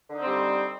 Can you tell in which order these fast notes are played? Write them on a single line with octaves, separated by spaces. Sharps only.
D3 D#4 C4 G3